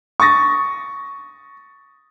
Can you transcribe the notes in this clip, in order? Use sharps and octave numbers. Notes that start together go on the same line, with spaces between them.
C#6 D#6 A6 A#6